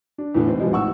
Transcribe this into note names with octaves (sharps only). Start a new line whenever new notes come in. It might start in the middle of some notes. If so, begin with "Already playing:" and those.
D4
E2 A2 D3
G#2 C4
B2 D3 F3 G3 G#3
A1 G#2 F#5 C#6 E6